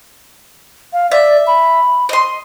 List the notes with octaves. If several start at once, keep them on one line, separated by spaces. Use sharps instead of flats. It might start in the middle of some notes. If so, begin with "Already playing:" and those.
F5
D5 E5
B5
D#5 C6